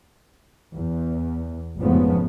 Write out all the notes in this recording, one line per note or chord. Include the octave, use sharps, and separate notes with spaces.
E2
F1 G#2 C#3 F3 A3 B3